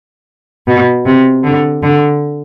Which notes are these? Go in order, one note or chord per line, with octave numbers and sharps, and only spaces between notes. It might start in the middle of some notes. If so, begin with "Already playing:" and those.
B2
C3
D3
D3